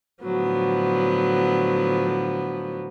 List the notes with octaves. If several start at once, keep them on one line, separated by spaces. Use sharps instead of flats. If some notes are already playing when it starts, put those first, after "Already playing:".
A2 D3 F3 F#3 B3